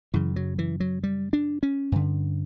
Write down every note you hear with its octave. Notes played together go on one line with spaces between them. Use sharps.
F#2 C#3 E3
F#3
E3
F#3
G3
D4
C#4
G2 D3